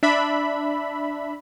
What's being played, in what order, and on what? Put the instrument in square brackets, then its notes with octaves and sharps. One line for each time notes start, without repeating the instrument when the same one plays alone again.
[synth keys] D4 E5 B5